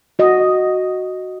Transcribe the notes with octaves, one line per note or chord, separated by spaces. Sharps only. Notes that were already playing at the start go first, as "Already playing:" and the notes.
F#4 D#5